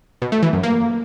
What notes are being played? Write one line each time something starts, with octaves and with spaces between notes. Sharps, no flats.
B2
A3
E3
F#2
A#3